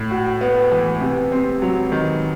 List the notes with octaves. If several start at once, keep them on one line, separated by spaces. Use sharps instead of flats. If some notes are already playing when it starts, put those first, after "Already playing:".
Already playing: A2
F#4
B3
E3
C3
C4
F#3
D#3